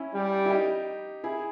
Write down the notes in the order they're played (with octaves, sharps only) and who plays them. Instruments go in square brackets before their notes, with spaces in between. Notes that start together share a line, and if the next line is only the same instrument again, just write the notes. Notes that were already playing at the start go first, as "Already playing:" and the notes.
Already playing: [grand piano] C#4 E4
[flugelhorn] G3
[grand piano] E4
D#4 G4
E4 G#4